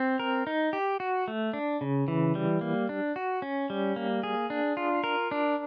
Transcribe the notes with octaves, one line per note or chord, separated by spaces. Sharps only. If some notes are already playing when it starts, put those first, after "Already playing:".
Already playing: C4
A#4
D#4
G4
F#4
A3
D4
C#3
E3
G3
A#3
D4
F#4
C#4
G3
A#3
G#4
D4
F4
A#4
D4